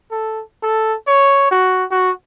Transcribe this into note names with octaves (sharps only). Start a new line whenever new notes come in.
A4
A4
C#5
F#4
F#4